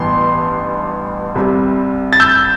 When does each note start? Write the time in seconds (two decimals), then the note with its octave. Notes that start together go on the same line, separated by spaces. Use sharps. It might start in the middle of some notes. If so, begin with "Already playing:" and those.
Already playing: A1 G2 E3 B3 C6
1.35 C2 C3 G3
2.13 A6
2.20 E6 G6